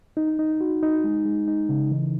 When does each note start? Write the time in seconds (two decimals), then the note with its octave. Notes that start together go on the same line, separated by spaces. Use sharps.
0.17 D#4
0.39 D#4
0.61 F#4
0.83 D#4
1.04 G#3
1.25 G#3
1.48 D#4
1.69 C#3
1.91 E3